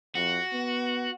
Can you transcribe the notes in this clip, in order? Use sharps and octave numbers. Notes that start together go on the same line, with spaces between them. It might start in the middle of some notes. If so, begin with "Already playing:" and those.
F2 F#4
B3